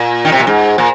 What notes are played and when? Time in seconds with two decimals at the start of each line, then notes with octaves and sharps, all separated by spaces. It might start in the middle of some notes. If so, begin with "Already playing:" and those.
Already playing: A#2
0.25 D#3
0.32 C3
0.39 A#2
0.47 G#2
0.78 A#2